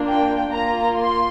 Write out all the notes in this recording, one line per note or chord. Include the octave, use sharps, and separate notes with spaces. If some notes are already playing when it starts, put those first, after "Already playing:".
Already playing: A#3 D4 F4
G5
A#3 F4 A#5
C6